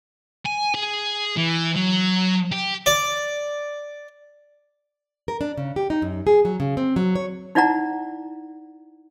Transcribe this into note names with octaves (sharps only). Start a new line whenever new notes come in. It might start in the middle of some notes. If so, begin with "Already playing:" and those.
G#5
G#4
E3
F#3
G4
D5
A#4
D4
C#3
G4
D#4
F#2
G#4
F#3
C#3
C4
F#3
C#5
D#4 E4 D5 F#5 A#5